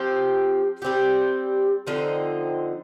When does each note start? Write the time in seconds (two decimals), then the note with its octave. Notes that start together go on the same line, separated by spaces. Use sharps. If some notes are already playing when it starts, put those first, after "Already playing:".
Already playing: F3 C4 G4
0.82 G3 C4 G4
1.87 D3 F3 C4 D#4